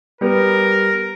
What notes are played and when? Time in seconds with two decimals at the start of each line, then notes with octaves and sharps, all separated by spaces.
0.21 G3 B3 A#4